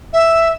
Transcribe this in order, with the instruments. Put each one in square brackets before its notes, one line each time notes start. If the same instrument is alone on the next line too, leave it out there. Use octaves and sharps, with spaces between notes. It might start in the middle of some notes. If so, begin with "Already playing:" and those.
[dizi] E5